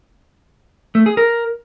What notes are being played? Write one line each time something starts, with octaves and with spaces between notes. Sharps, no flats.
A3
G#4
A#4